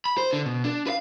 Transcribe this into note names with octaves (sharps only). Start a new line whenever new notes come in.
B5
C5
D3
B2
D4
B4 F5